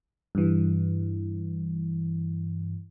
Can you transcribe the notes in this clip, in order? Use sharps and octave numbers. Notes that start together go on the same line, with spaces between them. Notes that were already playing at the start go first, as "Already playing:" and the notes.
G2 E3